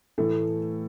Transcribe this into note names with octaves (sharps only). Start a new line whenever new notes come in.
A2 E3 A3